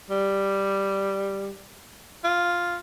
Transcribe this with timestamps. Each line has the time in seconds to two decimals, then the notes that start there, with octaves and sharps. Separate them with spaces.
0.10 G3
2.24 F4